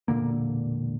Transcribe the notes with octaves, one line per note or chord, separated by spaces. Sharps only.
E1 A#2 D3 A#3